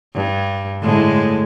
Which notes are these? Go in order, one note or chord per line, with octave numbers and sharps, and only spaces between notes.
G2
A2 D3 G#3